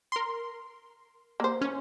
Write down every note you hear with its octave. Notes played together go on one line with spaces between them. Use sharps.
A#4 C6
A#3 C5
C#4